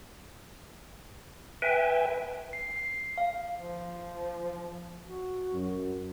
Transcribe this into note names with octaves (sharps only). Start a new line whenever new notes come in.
B4 E5 G5 G#5
C7
C7
F5
F3
F#4
F#2